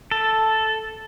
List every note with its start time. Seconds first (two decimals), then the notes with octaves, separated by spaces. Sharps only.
0.11 A4